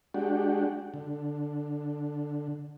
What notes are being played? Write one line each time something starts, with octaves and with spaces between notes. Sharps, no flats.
G#3 D4 F#4 G4
D3